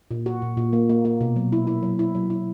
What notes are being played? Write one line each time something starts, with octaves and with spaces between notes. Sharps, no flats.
A#2
F#4
A#2
A#2
A#3
A#3
A#3
B2
F#3
E4
E4
F#3
E4
F#3
E4